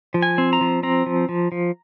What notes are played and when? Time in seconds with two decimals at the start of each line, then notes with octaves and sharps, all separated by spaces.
0.14 F3
0.22 G#5
0.38 C4
0.53 A#5
0.61 F3
0.83 C4 A#5
1.06 F3
1.29 F3
1.52 F3